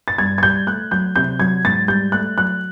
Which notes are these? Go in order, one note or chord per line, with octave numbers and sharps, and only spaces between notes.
A6
G2 G#6
G#6
G3 G6
A3 F#6
F#3 G6
C3 G6
F#3 G#6
G#2 A6
G3 G6
A3 F#6
F#3 F#6